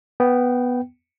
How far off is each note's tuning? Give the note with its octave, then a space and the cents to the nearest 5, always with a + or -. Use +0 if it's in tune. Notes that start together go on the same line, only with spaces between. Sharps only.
B3 +0 G5 -15